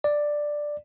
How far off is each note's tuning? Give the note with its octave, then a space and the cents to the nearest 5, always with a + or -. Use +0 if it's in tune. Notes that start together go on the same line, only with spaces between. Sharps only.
D5 +5